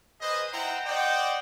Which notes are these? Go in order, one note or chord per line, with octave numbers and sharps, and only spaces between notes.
G#4 B4 C5 D#5
D#4 E4 C5 F#5 G5 A#5
C5 D5 D#5 F#5 G5